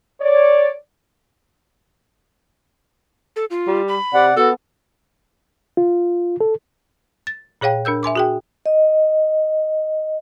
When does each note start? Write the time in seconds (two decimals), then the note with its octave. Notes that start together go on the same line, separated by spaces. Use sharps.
0.20 C#5 D5
3.36 A4
3.50 F4
3.68 G3
3.88 B5
4.14 C3 D5 F#5
4.36 B3 F#4 A4
5.77 F4
6.41 A4
7.27 A6
7.61 A#2 G#4 C#5 F5 G5
7.85 D4 A#4 E6 G6
8.03 E5 G#5 C6 D6
8.15 F#4 G#4 G5
8.66 D#5